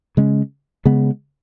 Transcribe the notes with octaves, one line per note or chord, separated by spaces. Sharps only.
C#3 G#3 C#4
C#3 G#3 B3